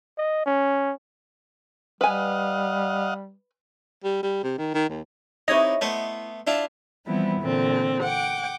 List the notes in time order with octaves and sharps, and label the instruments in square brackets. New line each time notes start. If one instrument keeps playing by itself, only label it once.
[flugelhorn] D#5
C#4
[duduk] G3 [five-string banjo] B4 G#5 [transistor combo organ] D#5 F5 F#5
[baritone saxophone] G3
G3
C3
D#3
D#3
D#2
[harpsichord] C3 D#4 [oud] E4 B4 [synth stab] C#5 D#5
[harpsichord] A3 B3 C5
D4 E4 F4
[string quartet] E3 F3 G3 B3 C4 E4
A#2 D3 E3 C4
F#5 G5 D6